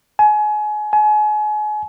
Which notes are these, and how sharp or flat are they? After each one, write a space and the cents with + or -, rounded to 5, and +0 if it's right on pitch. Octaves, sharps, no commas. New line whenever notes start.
G#5 +30
G#5 +35